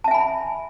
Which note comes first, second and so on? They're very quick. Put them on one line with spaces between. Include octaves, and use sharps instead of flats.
A5 E5 G#5 B5